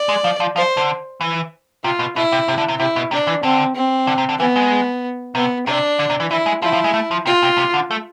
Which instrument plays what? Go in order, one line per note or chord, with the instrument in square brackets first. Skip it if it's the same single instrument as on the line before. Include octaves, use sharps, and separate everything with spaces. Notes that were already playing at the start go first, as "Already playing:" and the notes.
Already playing: [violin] D5
[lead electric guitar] G#3
F3
F3
[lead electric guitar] F3 [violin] C5
[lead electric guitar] D3
E3
[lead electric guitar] C3 [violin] F4
[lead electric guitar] B2
[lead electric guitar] B2 [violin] E4
[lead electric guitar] C3
C3
D3
C3
[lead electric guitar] C3 [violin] E4
[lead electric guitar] B2
[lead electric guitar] C3 [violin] D4
[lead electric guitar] E3
[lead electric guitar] D3 [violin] C4
[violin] C4
[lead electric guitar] D3
C3
D3
[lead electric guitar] E3 [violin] B3
[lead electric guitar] G#3
[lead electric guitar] C3 [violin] B3
[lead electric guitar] C3 [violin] D4
[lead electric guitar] D3
C3
E3
[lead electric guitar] E3 [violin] E4
[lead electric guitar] G#3
[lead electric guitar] F3 [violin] E4
[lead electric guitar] F3
G#3
A3
F3
[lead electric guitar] C3 [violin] F4
[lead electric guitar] C3
C3
D3
A3